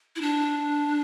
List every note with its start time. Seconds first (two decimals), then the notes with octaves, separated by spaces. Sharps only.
0.16 E4
0.21 D4